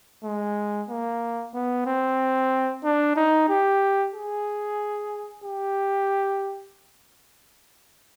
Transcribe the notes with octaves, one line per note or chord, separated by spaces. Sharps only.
G#3
A#3
B3
C4
D4
D#4
G4
G#4
G4